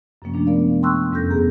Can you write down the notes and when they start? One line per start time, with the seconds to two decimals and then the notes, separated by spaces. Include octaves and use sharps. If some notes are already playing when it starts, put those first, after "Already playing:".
0.22 F#2 C3 F3 A#3 C#4
0.34 F3 A3 A#3 D4
0.47 G#3 B3 A#4 D5 F5
0.82 G5 A5 C6 C#6 E6 F#6
1.12 F2 G3 C#4 A4 G6 A#6
1.30 G2 B2 B3 G#4 A#5